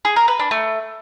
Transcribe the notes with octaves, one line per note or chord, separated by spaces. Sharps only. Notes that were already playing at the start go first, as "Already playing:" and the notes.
G#4
A#4
B4
D4
A3